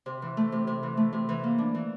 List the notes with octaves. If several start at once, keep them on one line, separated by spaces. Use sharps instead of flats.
C3
E3
A3
C3
C3
E3
A3
C3
E3
A#3
D4
E3